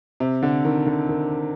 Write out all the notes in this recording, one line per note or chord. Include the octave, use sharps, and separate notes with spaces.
C3
D3
D#3
D3
D#3